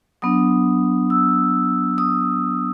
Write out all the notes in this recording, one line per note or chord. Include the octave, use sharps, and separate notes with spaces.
F#3 B3 D4 D#6
E6
D#6